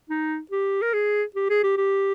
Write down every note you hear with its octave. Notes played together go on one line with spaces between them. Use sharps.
D#4
G4
A#4
G#4
G4
G#4
G4
G4